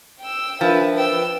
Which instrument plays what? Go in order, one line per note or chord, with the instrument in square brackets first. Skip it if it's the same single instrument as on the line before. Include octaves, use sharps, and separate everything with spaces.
[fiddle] G5 E6
[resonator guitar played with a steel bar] F3 [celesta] D4 A#4 E5 [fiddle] B4
[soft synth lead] B4 [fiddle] G5 E6